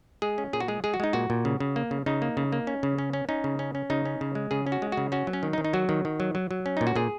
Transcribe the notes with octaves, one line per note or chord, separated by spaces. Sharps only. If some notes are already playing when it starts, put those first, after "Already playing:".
G#3 G#4
C#4
A#2 G#4
F#4
G#3 G#4
G#3 G#4
F#4
G#3 D#4
A#2 F#4
A#2
C#3
C#3
A#3
C#3
C#3 D#4
A#3
C#3
A#3
C#4
C#3
C#4
C#4
C#4 D#4
C#3
C#4
C#4
C#3 D#4
C#4
C#3
G#3
C#3 G#4
C#4
F#4
G#3
F#4
C#3
C#4 F#4
F#3
C#4
D#3
D#4
D#3
D#4
F#3 F#4
D#3
D#3
F#3
F#3
F#3
C#4
A#2 D#4
F#4
A#2 G#4